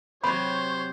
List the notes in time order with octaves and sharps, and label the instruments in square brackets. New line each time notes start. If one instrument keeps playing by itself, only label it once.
[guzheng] C3 F#3 [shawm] C5 [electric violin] C#5 [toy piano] B5